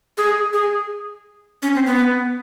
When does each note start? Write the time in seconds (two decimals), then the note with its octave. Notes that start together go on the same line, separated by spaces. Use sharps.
0.18 G#4
0.53 G#4
1.63 C#4
1.75 C4
1.86 B3